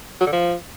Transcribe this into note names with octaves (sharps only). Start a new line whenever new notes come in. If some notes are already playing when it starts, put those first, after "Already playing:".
F#3
D3
F3